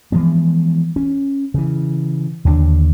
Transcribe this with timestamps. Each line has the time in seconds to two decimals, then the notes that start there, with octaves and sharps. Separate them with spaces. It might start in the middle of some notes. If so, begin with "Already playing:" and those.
0.12 E3 F3 G#3 B3
0.96 C#4
1.54 C#3 E3
2.45 D#2 D3 D#3 D4